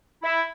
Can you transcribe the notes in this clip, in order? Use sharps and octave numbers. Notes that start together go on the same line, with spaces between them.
E4